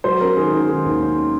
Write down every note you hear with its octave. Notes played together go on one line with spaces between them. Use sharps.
F#3 C5
C#4 A#4
D#3 G#4
D#3
D#3 G#4
D#2
C#4